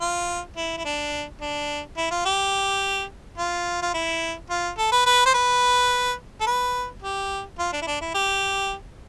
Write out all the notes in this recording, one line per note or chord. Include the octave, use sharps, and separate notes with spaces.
F4
E4
E4
D4
D4
E4
F4
G4
F4
F4
E4
F4
A4
B4
B4
C5
B4
A4
B4
G4
F4
D4
E4
D4
E4
G4